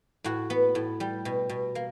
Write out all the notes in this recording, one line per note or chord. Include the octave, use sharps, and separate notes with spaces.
A2 F#4
B3
A2
G3
B2
B2
A#3